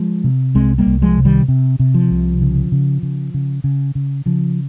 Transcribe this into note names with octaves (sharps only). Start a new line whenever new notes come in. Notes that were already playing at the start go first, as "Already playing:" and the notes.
Already playing: F3 G#3
C3
C2 G#3 C4
G3 A#3
C2
F3 G#3
C3
D#3 G3
C3
C3
F3
C2
C#3
C#3
C#3
C#3
C#3
C#3
C#3 F3